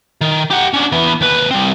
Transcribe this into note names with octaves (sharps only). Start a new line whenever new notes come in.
D#3
G4 F#5
C#4 D4
E3 B3
D#2 B4
G3 C4